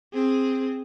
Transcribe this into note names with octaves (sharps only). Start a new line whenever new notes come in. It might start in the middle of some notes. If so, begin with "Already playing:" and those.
C4 G#4